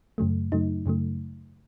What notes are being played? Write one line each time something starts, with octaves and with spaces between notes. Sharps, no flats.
F#2 C#3 F#3 A3
F#2 C#3 F#3 A3 D#4
F#2 C#3 F#3 A3